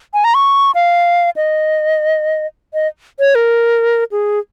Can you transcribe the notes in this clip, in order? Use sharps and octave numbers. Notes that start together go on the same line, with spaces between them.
G#5
A#5
C#6
F5
D#5
D#5
C#5
A#4
G#4